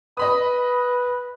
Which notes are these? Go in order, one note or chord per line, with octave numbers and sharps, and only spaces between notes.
B4 D#5 B5 D#6